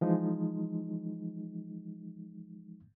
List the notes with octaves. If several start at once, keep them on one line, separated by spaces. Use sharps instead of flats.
E3 F3 G#3 D#4